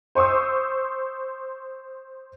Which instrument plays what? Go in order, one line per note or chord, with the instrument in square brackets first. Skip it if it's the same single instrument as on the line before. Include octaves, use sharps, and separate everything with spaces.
[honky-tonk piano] C5 C6 C#6 D#6 E6